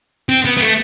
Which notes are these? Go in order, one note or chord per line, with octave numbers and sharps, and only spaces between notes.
C4
B3
B3
A3